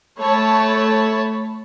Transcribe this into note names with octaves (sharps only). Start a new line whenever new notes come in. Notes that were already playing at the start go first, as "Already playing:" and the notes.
A3 C#5 A5 B5